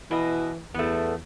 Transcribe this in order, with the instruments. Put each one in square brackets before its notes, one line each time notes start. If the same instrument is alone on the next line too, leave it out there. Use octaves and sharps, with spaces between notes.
[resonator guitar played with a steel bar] B2 D#5 [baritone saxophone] E3
[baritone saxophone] E2 [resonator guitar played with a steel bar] A3 B3